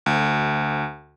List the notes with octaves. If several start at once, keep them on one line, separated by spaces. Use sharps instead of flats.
D2